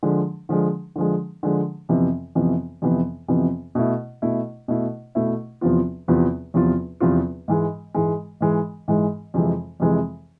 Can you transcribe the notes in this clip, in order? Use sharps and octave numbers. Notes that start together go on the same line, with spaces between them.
D3 F3 G#3
D3 F3 G#3
D3 F3 G#3
D3 F3 G#3
F2 C3 E3 B3
F2 C3 E3 B3
F2 C3 E3 B3
F2 C3 E3 B3
B2 A3 E4
B2 A3 E4
B2 A3 E4
B2 A3 E4
E2 C3 F3 B3 F4
E2 C3 F3 B3 F4
E2 C3 F3 B3 F4
E2 C3 F3 B3 F4
G#2 E3 G#3
G#2 E3 G#3
G#2 E3 G#3
G#2 E3 G#3
F2 C3 E3 G#3
F2 C3 E3 G#3